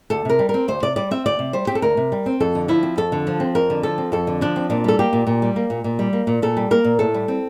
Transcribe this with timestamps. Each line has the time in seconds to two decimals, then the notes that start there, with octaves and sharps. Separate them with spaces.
0.10 D2 A4
0.25 C3 A#4
0.39 G3
0.49 A#4
0.54 C4
0.68 D2 C5
0.83 C3 D5
0.96 G3 D5
1.11 C4 E5
1.26 D2 D5
1.39 C3
1.53 G3 C5
1.67 C4 G4
1.75 A4
1.82 D2 A#4
1.97 C3
2.12 G3
2.26 C4
2.40 F2 A4
2.55 D3
2.68 F3 E4
2.83 C4
2.97 F2 A4
3.12 D3
3.27 F3
3.40 C4
3.55 F2 A#4
3.70 D3
3.83 F3 A4
3.98 C4
4.12 F2 A4
4.27 D3
4.41 F3 D4
4.56 C4
4.70 A#2 D4
4.84 G3 A4
4.99 A#3 G4
5.13 A#2
5.27 A#2
5.42 G3
5.56 A#3
5.70 A#2
5.84 A#2
5.99 G3
6.13 A#3
6.27 A#2
6.42 A#2 A4
6.57 G3
6.71 A#3 A#4
6.84 A#2
6.99 A2 A4
7.14 G3
7.28 C4